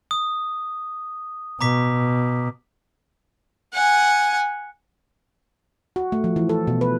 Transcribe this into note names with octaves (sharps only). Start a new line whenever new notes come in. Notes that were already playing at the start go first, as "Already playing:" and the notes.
D#6
B2 A#5 D6 B6
F#5 G#5
F#4
A3
F3
E3
A4
B2
B4